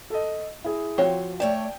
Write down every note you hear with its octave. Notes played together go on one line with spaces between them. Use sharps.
A4 D#5
E4 G#4
F3 C4 F#4 C#5
A3 C#5 D5 G5 A5